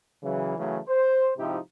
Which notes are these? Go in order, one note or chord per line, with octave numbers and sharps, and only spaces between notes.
C#3 E3 F#3
C#3 E3 F#3 A3
C5
G#2 C3 F3 D#4 E4 G4